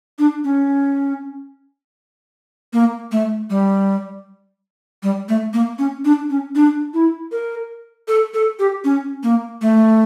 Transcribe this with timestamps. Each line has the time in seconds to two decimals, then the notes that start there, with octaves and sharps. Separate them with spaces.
0.19 D4
0.44 C#4
2.73 A#3
3.12 A3
3.50 G3
5.03 G3
5.29 A3
5.53 A#3
5.79 C#4
6.05 D4
6.30 C#4
6.55 D4
6.94 E4
7.32 A#4
8.08 A4
8.34 A4
8.59 G4
8.84 C#4
9.23 A#3
9.62 A3